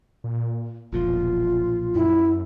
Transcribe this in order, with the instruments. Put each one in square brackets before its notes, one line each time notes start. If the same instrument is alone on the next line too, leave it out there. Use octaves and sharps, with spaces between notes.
[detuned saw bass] A#2
[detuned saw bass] E1 [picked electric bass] B1 A#2 F3 [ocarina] F4
[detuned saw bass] F#2 [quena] E4